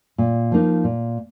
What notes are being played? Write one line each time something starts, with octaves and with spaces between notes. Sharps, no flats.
A#2
F3 A#3 D#4
A#2